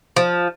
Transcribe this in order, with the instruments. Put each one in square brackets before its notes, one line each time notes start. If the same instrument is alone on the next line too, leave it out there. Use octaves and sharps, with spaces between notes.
[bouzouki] F3